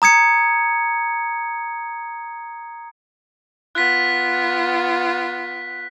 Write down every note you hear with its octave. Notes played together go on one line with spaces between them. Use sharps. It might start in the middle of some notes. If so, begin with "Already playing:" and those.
A#5 D#6 G#6 C#7
B3 F4 F#6 B6